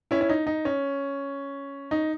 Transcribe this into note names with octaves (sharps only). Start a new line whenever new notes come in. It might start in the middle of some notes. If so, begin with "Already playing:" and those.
C#4 E4
C#4
D#4
D#4
C#4
D#4